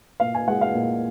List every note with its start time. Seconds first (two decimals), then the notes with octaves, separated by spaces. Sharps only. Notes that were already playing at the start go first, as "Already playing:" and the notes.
0.20 A#2 F5
0.35 G#5
0.48 G#3 F#5
0.61 F5
0.75 A#2